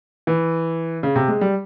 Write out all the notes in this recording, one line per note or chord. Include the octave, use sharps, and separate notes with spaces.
E3
C#3
C3
G#3
G3